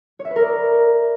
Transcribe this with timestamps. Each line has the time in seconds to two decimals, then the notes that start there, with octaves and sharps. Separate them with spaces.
0.19 C#5
0.25 E5
0.30 B4
0.36 A#4
0.41 D5